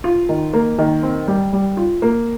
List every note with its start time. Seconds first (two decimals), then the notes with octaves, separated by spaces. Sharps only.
0.04 F4
0.29 D#3
0.53 A#3
0.79 D#3
1.03 C4
1.28 G3
1.53 G3
1.77 F4
2.02 A#3